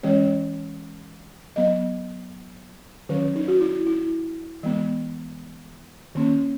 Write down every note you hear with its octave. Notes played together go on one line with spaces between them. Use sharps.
E3 G#3 C#4 C#5
F#3 B3 D#5
D#3 F#3 C#4 B4
D#4
F#4
E4
E4
E3 G#3 B3
D#3 A#3 C#4